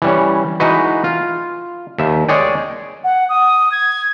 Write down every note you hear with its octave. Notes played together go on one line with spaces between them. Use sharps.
E3 G3 C#4
E3 G#3 D#4 F#4 B4
F4
D#2 E5
G#3 G#4 C#5 D5 G5
F#5
D#6
G#6